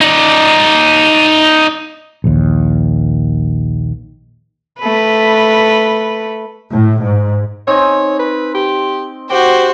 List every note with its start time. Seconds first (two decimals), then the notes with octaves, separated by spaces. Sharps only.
0.01 D#4 D5
2.24 A#1 D#2
4.80 A3 B4
6.72 A2
7.03 G#2
7.67 C4 D#4 C#5 G#5
8.19 B4
8.54 G4
9.30 F#4 G4 C5 G5